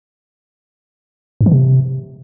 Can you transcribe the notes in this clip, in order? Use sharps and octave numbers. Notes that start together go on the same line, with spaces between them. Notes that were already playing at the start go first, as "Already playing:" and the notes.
G2
E3
C3